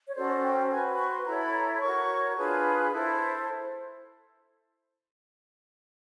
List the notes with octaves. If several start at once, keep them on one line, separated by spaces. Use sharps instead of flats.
C#5
C#4 F#4 A4 C5 D5
G5
F#4 B4 G#5
C#6
C6
E4 A4 C#5 A#5
B5
A#5
C6
F#4 A#4 C#5 C#6
D4 F4 G#4 B4 A5
E4 A4 C5